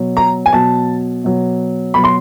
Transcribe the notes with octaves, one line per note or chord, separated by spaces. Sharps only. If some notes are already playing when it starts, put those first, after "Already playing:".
Already playing: B2 F#3
A#5
G#5
B2 F#3 A5
B2 F#3
B2 F#3 B5
C6